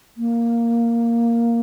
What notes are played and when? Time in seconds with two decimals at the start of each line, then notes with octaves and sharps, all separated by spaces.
0.17 A#3